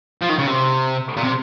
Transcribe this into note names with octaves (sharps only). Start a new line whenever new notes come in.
F3
D#3
C#3
C3
A#2
C3